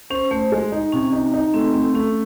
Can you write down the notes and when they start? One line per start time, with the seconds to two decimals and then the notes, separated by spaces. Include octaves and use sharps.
0.10 C#4 C5
0.31 A3 C5
0.52 G#3
0.72 D#4
0.92 C3 C#4
1.12 D#4
1.34 D#4
1.54 A3 C4
1.74 A3 C4
1.94 A3 C#4